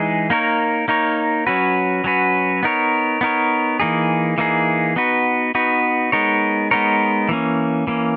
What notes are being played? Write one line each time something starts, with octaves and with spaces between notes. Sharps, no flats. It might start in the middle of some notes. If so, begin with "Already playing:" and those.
Already playing: E3 G#3 D#4 G#4
A#3 D#4 A#4 C#5
A#3 D#4 A#4 C#5
F#3 C#4 F#4 B4
F#3 C#4 F#4 B4
B3 D#4 A#4 C#5
B3 D#4 A#4 C#5
E3 A#3 D#4 G#4
E3 A#3 D#4 G#4
B3 D#4 F#4 B4
B3 D#4 F#4 B4
G#3 B3 D#4 A#4 C#5
G#3 B3 D#4 A#4 C#5
E3 A#3 C#4
E3 A#3 C#4